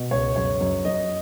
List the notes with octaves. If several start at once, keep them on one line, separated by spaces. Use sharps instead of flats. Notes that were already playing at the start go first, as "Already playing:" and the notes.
Already playing: B2
C#2 C#5
F#2 C#5
F#2
F#2 D#5